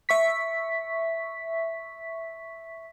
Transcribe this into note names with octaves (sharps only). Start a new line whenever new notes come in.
E5 C#6 B6